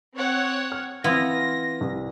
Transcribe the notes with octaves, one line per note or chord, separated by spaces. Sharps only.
C4 C#5 F#5
F6
E3 B3 C4 E4 F4 A#6
C2